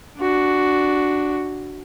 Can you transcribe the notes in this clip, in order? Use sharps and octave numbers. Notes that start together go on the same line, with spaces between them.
D4 F#4